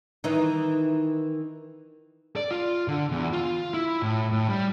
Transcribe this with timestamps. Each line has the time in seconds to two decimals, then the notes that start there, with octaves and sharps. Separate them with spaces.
0.24 D#3 E3 D#4
2.36 D5
2.51 F4
2.88 D3
3.12 E2
3.33 F4
3.74 E4
4.02 A2
4.32 A2
4.48 G3